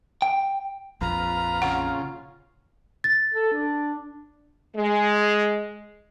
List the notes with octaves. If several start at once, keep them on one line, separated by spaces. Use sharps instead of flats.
G5
A#1 F2 F4 B4 A#5
C#3 F4 F#5
A6
A4
D4
G#3